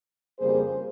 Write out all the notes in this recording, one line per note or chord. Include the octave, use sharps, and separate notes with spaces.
F2 C#3 G3 A#3 G#4 C5